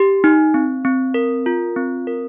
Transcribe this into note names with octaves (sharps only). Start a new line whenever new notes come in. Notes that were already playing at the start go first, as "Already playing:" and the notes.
Already playing: G4
D#4
C4
C4
A#4
F4
C4
A#4